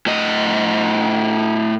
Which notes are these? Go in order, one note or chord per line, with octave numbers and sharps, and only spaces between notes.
A2 D#5